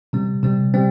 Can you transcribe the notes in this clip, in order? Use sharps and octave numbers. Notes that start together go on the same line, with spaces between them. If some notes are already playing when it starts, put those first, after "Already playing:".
C3 G3 C4
C3 G3 C4
G3 C4